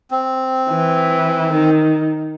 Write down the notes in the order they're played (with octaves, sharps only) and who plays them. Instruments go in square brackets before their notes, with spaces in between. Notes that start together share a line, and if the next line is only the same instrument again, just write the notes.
[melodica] C4
[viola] E3
D#3